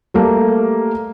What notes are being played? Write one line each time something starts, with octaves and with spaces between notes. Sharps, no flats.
G3 A3 A#3